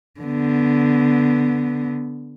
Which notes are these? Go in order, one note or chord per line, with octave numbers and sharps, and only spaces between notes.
D3 B3